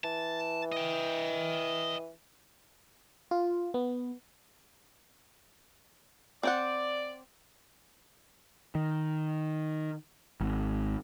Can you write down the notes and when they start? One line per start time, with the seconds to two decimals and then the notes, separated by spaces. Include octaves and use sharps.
0.04 E3 A5
0.72 D#5 G5
3.31 F4
3.74 B3
6.43 C4 C5 D5 F#5
8.75 D#3
10.40 G#1